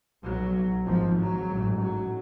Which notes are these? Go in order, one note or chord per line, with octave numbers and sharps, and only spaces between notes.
B1 B2 F#3
G#1 G#2 F3
F#3
A1 G#2
F#3